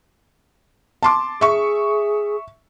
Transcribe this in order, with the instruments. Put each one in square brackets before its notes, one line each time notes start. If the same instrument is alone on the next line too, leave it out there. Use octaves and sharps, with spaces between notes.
[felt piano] A5 C6 D6
[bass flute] G#4 [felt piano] E5 C#6